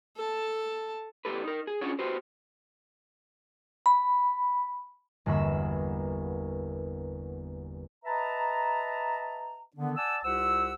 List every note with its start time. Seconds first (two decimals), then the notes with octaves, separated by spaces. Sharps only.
0.16 A4 A5
1.25 E2 A2 D#3 G4 A4 B4
1.44 D#4 A#4
1.67 G#4
1.81 C#4 D4 F4 F#4 G#4 C#5
1.99 F#4 G4 B4 C5
3.86 B5
5.26 G1 E2 A#3 F#4 B5 E7
8.05 B4 D#5 E5 A5 A#5
9.77 D3 D#3 B3 D4
9.96 D5 F#5 G#5 A5 E6
10.24 C2 F4 G4 C5 F#5 E6